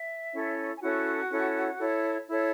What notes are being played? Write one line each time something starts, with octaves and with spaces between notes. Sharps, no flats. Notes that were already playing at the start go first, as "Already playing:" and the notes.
Already playing: E5
C#4 E4 A4 C#5
G#5
C#4 E4 F#4 A4 C#5 F#5
C#4 E4 A4 C#5
E4 A4 C#5
E4 A4 C#5